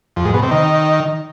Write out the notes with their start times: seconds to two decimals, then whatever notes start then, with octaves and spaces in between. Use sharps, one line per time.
0.16 F2
0.25 G#2
0.34 B2
0.42 C3
0.51 D#3